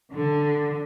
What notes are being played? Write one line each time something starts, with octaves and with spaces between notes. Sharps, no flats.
D3